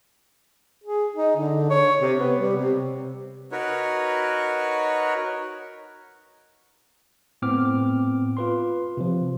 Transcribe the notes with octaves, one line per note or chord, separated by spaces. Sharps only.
G#4
D#4
D3
C#5
C3
B3
G3
C3
D#4 F#4 A#4 B4 C#5
A2 B3 C4 D6 F6
F4 B4 C6
C3 F3